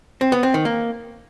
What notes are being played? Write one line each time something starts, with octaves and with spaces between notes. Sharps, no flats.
C4
B3
C4
D#3
A#3